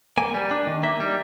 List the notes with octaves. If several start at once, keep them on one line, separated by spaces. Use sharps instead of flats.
A#3 G#5
G3
D4
D#3
A#3 E5
G3